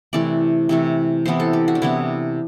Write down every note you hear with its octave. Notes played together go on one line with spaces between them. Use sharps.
C3 E3 A3 D5
C3 E3 A3
C3 E3 B3 C5
A4
G4
F#4
D4
C3 E3 B3 E4